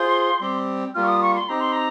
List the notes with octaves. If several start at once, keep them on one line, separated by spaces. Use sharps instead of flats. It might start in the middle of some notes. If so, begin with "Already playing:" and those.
Already playing: F4 G#4 C5 C6
G3 C4 G4
G3 A#3 F4 F6
C#6
D#6
C#6
C6
C4 D#4 G4 A#5
C6
A#5